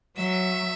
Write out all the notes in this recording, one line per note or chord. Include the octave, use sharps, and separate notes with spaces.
F#3 E5